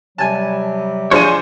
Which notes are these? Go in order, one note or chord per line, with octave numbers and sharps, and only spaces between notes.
C3 F#3 G3 G#5 A5
F3 G#3 D4 C5 C#5 G#5